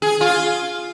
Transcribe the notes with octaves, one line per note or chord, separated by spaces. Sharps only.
G#4
F4